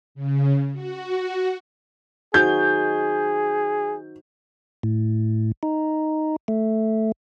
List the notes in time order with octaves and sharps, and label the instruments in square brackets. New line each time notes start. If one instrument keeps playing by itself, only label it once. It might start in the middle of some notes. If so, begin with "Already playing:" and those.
[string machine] C#3
F#4
[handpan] D#4 F#4 C5 [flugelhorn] G#4 [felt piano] G6
[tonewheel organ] A2
D#4
A3